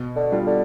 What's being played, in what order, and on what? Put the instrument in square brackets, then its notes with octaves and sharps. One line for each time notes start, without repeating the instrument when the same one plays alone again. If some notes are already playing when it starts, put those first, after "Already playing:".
Already playing: [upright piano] B2
[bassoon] D3
[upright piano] G3 D4 F4
[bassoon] D3